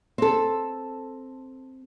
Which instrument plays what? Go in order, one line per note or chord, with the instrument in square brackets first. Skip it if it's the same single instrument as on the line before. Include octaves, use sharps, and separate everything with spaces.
[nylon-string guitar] C4 A4